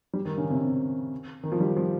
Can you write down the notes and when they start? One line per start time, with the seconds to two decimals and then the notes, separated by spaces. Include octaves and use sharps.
0.13 G3
0.25 D#3
0.37 C#3
0.50 C3
0.63 C3
1.44 D#3
1.52 F3
1.60 G3
1.77 F3